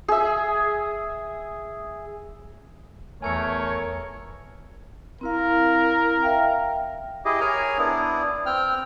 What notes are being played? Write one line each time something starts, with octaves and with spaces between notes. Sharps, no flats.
G#4 E5
E2 A3 A#4 C#5 G#5 G#6 C#7
C4 E4 A#4 F5
E5 F5 G5
E4 G4 G#4 D#5
G#4 A#4 C#5 G#5 A#5
B3 D4 E4
C4 G5 F6